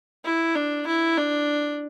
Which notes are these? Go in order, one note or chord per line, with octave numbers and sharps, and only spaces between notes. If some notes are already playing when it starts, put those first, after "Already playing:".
E4
D4
E4
D4